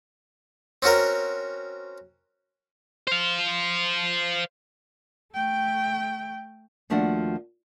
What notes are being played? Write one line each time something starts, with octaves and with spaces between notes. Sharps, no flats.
C4 C#4 F#4 A#4
C5 F5
A3 G5
D#2 F3 A3 D4 F#4 F#5